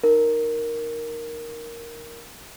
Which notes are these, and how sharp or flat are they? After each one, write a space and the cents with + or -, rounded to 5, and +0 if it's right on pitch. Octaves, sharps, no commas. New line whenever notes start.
D#4 -15 A#4 +0